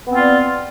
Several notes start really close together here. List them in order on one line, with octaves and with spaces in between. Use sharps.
B3 C4 F4 D5